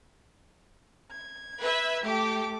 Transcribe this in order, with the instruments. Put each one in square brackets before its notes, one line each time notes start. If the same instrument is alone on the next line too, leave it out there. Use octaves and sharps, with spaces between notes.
[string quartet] G#6
[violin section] B4 E5
[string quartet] A3 A4 D6 [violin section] G4